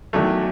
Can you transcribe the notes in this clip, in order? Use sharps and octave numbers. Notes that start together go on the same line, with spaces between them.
E2 D#3 F#3 A3